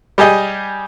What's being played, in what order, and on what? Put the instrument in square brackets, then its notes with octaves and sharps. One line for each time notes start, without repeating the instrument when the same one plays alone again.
[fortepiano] G3 G4 G#4 D#5